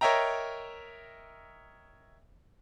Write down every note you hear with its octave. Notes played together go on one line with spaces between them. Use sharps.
A#4 C#5 D#5 E5 G5 A#5